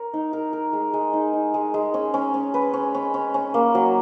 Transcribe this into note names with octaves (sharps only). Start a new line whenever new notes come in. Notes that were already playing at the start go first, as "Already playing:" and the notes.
Already playing: A#4 C#5
D#4
A#4
A#4
G#3
G#3
D#4
D#4
G#3
G#3
C#4
C#4
C#4
B4
C#4
C#4
C#4
C#4
A#3
F#3